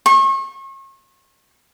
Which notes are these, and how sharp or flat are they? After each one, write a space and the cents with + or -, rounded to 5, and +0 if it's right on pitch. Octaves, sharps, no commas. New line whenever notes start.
C#6 -40